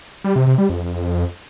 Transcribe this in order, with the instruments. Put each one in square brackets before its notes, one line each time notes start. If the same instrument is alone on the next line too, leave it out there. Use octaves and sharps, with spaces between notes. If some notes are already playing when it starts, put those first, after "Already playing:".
[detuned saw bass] G3
C3
C3
G3
F2